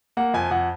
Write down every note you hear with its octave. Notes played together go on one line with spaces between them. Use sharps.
A#3 F#5
F2 G#5
F2 F#5